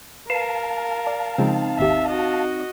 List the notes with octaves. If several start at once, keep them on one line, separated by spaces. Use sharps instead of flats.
A#4 B4 F5 A5
D5
C#3 F3 G#3 C4 D#4
G#1 D#2 G4 E5
F#4 D#5